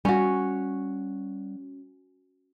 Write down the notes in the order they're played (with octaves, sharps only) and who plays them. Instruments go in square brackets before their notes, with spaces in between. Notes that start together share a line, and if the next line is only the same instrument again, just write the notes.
[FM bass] G3 [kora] C#4 F#4